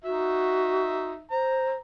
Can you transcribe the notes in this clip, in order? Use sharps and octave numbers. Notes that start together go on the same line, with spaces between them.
D#4 F#4 E5
C5 A#5